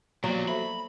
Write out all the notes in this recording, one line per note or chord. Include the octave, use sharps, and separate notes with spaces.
F3 F#3 A#3 B3 D5
A4 C5 E5 B5